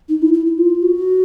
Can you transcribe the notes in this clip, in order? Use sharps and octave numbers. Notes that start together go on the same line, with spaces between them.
D#4
E4
E4
E4
F4
F#4